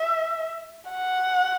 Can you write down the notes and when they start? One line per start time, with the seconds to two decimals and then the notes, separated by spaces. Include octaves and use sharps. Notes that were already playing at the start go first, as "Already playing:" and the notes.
Already playing: E5
0.91 F#5